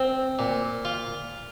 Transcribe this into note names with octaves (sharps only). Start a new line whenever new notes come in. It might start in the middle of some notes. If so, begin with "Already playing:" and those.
Already playing: C4
A#2
F4